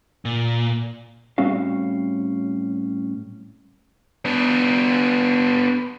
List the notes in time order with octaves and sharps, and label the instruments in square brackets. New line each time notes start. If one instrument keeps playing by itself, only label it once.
[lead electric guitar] A#2
[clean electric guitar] A2 G3 C4 C#4 F#4 F5
[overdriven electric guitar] B3 D4